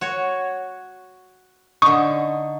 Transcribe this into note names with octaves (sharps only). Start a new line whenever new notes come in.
F#4 C#5
D3 D#4 C#6 D#6